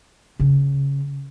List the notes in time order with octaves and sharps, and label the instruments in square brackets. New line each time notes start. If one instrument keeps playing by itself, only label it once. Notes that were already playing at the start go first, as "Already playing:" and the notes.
[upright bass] C#3